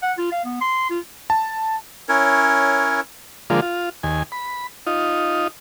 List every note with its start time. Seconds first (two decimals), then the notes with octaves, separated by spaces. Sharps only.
0.02 F#5
0.18 F4
0.32 F5
0.45 B3
0.61 C6
0.90 F4
1.30 A5
2.09 C#4 E4 A#4 C#5
3.50 D3 F3 G#3 A#3 F4
3.62 F4
4.03 D#2 G#5
4.32 B5
4.87 D#4 F4